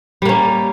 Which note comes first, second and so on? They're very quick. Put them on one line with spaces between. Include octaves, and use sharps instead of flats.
G3 A#3 C#4